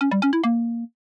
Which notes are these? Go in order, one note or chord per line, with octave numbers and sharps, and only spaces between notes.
C#4
G3
C#4
E4
A#3